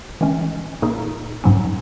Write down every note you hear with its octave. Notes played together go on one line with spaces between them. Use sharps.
E3 G#3 C#4
A#2 A#3 D#4 G#4
G#2 F#3 C#4